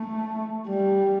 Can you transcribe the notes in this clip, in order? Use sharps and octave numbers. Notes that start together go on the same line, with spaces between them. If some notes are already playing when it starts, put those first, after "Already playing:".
Already playing: A3
G3